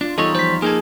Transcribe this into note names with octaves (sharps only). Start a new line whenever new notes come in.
D4 F4
E2 G3 D#4 F4 A4 C#5 D#5
F3 C5 B6
A#3 D#4 G#4 A4 G#5